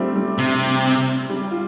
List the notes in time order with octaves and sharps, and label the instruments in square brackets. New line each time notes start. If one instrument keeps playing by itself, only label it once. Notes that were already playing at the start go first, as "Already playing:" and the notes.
Already playing: [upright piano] G3 A3 C4 D4 F4
G3
[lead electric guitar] C3
[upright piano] G3
F4